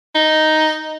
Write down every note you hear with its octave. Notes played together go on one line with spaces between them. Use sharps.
D#4